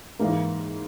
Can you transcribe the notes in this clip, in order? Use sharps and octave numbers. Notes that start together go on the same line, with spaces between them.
G#2 E3 A#3 D#4 A#4